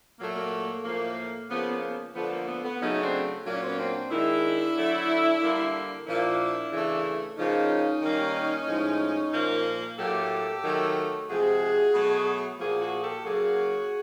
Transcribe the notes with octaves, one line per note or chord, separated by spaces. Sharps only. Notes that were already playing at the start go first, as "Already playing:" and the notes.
A#2 F#3 A3 A#3
A#3
A2 F3 A#3
C#3 F3 A#3 B3
B3
D3 F3 A3 B3
A#3
B3
B3
C#3 F#3 A3 C#4 D#4
C4 D4
A#2 F#3 A#3 D4
C#4
C4
B3 C#4
C4 D4
D#3 G#3 D4 E4
D3 F#3 A3
D3 G3 A#3
A#2 F3 A#3 D4 E4
C#3 E3 A3
C#3 F3 A#3 C#4 D#4
D#3 G3 A#3
A2 F3 G#3
A#2 F3 A#3
A2 F#3 A#3 G4 A4
D#3 F#3 A3
C3 F3 G#3 F#4 G#4
B2 F#3 A3
A#2 F3 A#3 F#4 G#4
F#4 G#4
G4 A4
C#3 F#3 A#3 F#4 G#4